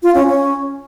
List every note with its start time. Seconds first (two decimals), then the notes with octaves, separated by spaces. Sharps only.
0.03 F4
0.14 C#4
0.26 C#4